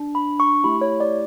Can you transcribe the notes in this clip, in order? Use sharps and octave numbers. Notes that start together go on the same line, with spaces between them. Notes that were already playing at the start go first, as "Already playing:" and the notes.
Already playing: D4
B5
C#6
A3 E4 G4 B5
C#5
D5